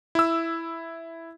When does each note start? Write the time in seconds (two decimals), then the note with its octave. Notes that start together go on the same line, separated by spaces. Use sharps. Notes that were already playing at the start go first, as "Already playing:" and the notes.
0.15 E4 E6